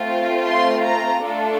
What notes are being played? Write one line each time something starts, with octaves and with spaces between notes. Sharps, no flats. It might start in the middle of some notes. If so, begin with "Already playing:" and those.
Already playing: A3 C4 F4
C6
A#5
A3 D4 F4 A4